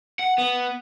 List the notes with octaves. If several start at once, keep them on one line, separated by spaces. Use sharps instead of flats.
F#5
B3